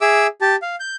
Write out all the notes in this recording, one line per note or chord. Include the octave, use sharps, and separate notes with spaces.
G#4 E5 D6 E6
G4 A5
F5
G6